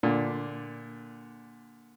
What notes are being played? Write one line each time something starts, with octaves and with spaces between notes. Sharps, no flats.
A#2 D3